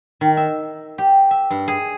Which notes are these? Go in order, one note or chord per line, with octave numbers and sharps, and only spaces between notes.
D#3
E5
G4
E5
G2
G#4